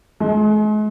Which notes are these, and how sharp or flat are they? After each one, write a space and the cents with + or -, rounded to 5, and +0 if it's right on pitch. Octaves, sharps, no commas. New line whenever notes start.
G#3 +40